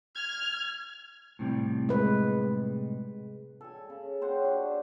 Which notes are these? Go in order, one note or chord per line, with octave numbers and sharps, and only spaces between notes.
F6 G#6
A2 C3 G3
G#3 B4
A4 G#5
C#3
G4 C5 C#5 F#5
D4 F#4